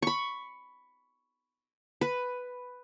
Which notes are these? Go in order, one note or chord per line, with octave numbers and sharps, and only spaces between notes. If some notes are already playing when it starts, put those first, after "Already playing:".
B5 C#6
B4